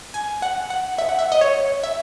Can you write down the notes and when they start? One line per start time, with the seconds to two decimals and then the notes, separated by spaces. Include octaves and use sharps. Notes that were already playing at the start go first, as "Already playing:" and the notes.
0.14 G#5
0.42 F#5
0.70 F#5
0.98 E5
1.09 F#5
1.19 E5
1.32 D#5
1.41 C#5
1.84 E5